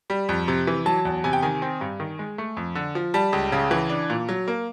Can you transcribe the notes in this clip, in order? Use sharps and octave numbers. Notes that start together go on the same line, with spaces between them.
G3
F2
C3
E3
F#3 A5
E2
C3 G#5
G5
D#3 G#5
C4
G2
D#3
G#3
A3
F2
D3
F3
G3 A5
C#2
C#3
E3
D4
A#2
F#3
A#3